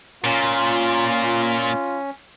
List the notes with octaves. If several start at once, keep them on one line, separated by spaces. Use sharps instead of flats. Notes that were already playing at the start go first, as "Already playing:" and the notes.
A#2 C#4 F4